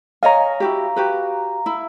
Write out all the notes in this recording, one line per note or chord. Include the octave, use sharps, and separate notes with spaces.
C#5 D#5 F5 G#5 A#5
E4 F#4 G4
F#4 G4 B4
E4